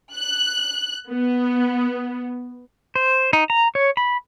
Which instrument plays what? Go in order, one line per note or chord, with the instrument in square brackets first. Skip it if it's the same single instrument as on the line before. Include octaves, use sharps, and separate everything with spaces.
[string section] F#6
B3
[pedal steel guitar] C5
D#4
A#5
C#5
B5